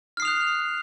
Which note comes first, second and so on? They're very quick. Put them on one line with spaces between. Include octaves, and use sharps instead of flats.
F6 C7 D#6 F7 F#6